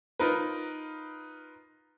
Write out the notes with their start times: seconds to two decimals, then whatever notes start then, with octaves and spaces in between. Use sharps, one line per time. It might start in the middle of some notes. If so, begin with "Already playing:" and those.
0.19 D#4 F4 A#4 B4